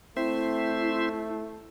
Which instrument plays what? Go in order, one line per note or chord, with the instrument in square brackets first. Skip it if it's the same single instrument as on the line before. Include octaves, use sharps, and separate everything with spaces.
[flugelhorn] A3 [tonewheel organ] C4 C5 E5 [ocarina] E4